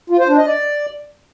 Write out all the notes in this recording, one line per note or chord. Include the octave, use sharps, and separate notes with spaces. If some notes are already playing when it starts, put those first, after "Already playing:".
F4
C5
D4
D#5
D5